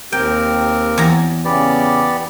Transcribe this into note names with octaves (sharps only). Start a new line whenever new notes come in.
D#2 C4 G4 A#4 G5
E2 A#5
C#3 B3 C#4 G4 D5